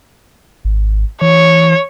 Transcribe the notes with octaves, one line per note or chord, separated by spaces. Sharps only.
G#1
E3 C#5